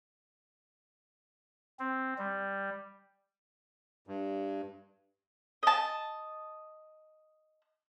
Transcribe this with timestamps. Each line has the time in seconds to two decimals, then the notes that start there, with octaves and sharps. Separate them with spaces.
1.79 C4
2.18 G3
4.07 G2
5.63 D#5 A5